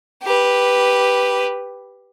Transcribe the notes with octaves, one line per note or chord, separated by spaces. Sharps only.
G4 B4